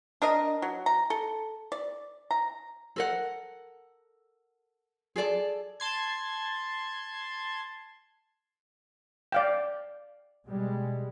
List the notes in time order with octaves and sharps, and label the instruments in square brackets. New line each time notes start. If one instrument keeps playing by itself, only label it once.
[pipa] D4 A#4 D#5
F#3
A#5
A4
D5
A#5
[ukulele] A4 A#4 F#5
G#4 A4 D5 A5
[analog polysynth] A5 C6 G#6
[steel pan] D5 F5 G5
[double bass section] B2 G3 G#3